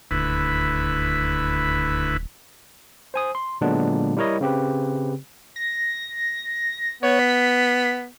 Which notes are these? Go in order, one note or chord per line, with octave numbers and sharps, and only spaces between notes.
D#1 D2 E4 B4
C5 G#5 D#6
C6
A#2 D3 F#3 G#3 B3 D4
G3 E4 A#4 C#5 D#5
C#3 C4 G4 B4
A#6
B3 C#5
B6